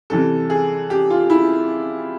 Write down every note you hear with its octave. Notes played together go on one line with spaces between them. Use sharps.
C2 C3 E3 A4
G#4
G4
F4
E4